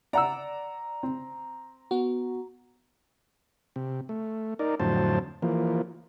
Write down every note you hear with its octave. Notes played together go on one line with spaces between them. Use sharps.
D5 F#5 A#5 E6
C4
B3 F#4
C3
A3
D#4 A#4 D5
F2 A2 D3 F#3 C5 A5
E3 F3 A#3